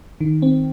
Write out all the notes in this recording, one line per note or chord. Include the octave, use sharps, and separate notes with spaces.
D#3
C4